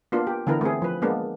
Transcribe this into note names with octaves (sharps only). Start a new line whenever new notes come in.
A#3 B3 D4 F4
G4
D3 E3 B3 E4 A#4
A3 C4 G#4
F3 B4
G#3 A#3 B3 D4